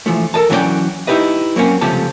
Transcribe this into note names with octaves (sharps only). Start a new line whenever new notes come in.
E3 F3 A3
A4 A#4 D#5 A5
E3 F#3 C#4 A#4 D5 G5
D#4 E4 G4 B4 D#5
F#3 A#3 C4 C#4
C#2 C3 F3 A3 G4 A5